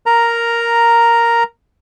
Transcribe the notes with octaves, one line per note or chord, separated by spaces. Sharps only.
A#4 A#5